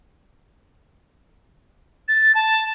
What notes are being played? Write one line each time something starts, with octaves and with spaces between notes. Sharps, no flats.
A6
A5